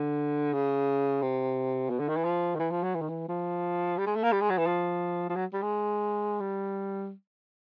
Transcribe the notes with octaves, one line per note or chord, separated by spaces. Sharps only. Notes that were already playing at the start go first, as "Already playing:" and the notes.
Already playing: D3
C#3
C3
B2
D3
D#3
E3
F3
D#3
E3
F3
F#3
E3
D#3
E3
F3
G3
G#3
A3
A#3
G3
G#3
F#3
E3
F3
F3
F#3
G3
G#3
G3